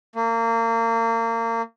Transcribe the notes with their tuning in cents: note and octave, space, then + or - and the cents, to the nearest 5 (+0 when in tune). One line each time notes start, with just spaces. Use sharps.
A#3 -30